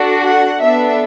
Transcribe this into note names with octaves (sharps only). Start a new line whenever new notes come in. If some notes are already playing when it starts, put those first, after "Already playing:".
Already playing: D4 F#4 A4
F#5
B3 D4 A4 E5